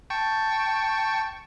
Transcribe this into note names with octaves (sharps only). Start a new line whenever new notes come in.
G5 A5 C#6